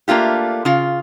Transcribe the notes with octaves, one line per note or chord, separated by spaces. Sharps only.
A3 A#3 D4 F4 G4
C#3 F4